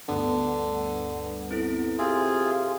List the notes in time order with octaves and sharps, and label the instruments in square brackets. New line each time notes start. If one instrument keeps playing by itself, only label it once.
[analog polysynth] D2 G2 B3 [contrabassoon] D3
[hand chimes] C4 E4 A4
[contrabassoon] C3 [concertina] F4 G#4 [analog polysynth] E5 G5